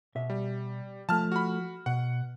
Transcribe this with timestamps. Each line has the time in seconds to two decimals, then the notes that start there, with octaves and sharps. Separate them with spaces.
0.15 B2 E5
0.30 G3
1.09 F3 A3 A5 F6
1.32 F#4 B5
1.86 B2 F#5